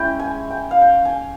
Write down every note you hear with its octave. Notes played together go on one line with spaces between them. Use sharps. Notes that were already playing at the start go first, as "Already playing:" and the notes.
Already playing: G#3 C#4 E4 G5
G#5
G5
F5
G5
G#5